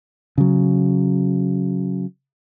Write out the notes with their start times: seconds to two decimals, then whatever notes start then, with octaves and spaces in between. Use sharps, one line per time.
0.38 C#3 F#3